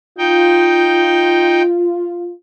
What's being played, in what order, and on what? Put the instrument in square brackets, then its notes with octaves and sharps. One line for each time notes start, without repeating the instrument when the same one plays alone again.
[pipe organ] D#4 G5 [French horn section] F4